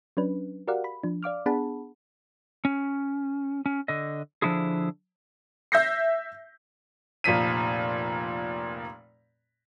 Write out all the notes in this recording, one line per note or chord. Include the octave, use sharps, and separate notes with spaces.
F#3 C#4 D4 B4
F#4 G4 A#4 D5 F5 F#5
B5
F3 D4
D5 F5 D6 F6
B3 D4 G#4 F#5 A5 B5
C#4
C#4
D3 D#5
D3 F3 D4 E4 F4 G#4
E5 G6 A#6 C7
F1 A#2 F3 B6 D#7